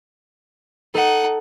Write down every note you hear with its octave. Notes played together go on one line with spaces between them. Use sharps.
D#4 A4 F#5